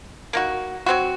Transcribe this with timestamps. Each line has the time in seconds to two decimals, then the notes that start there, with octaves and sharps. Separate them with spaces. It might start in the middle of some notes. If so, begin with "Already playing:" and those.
0.33 A#3 D#4 F#4
0.86 F#3 C4 F#4